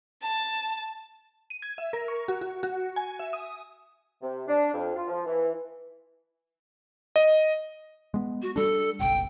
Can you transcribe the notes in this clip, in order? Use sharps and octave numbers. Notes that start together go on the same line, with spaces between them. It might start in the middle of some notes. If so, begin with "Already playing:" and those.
A5
D#7
G#6
E5
A#4
C#6
F#4
F#4
F#4
G#5
E5
D#6
C3
D4
F2
F4
F3
E3
D#5
G#3 B3
F#4
G3 D4 A4
F#1 B1 G5